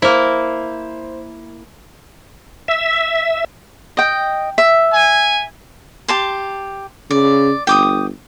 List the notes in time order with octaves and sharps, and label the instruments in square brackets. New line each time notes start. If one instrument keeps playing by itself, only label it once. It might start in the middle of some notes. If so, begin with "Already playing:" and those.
[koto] A#3 E4 [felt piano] C5
[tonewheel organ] E5
[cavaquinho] D#5 G5
E5
[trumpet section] G#5
[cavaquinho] G4 A5 C6
[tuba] C#3 [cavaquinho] D5
[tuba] G1 [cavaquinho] G5 D6 D#6